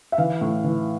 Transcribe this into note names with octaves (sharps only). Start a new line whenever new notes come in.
E5
E3 F5
A2
E3